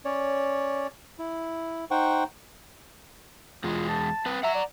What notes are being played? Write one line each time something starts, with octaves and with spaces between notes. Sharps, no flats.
C#4 C#5 D5
E4
D#4 C5 F#5 G5 C#6
E2 G#3 F4
A5
C4 B4
E5 F#5 A#5
D5